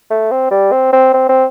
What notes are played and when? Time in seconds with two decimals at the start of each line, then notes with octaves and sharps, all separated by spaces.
0.11 A3
0.31 C4
0.51 G3
0.72 C4
0.93 C4
1.14 C4
1.29 C4